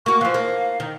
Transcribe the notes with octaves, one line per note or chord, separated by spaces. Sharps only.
A#3 F#4 C#6
E3 F3 F5
A#3
D#3